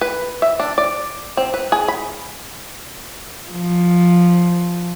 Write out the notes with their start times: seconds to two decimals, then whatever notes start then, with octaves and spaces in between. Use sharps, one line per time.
0.01 B4
0.42 E5
0.60 D4
0.78 D5
1.37 C4
1.54 B4
1.72 G#4
1.88 B5
3.51 F3